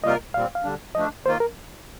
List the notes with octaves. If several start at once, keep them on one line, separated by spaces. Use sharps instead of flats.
C3 G3 A#3 F4 A#4 D#5
A#2 G3 C4 F5
F5
D3 G3 D4
F3 A3 D4 D#5
D#3 A#3 F4 C5
A#4